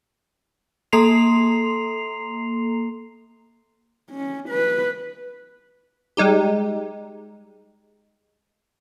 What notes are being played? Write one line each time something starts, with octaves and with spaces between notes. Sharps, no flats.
A#3 A4 A#5 C6 C7 F7
C#4
B4
G3 G#3 D#4 G4